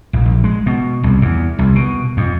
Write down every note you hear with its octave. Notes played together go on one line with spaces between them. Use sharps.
A#1
A#1
G#3
B2
C2
E2
C2
B2
F2